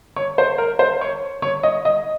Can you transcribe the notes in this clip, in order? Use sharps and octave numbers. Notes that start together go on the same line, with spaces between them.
C#5
C5
A#4
C5
C#5
C#5
D#5
D#5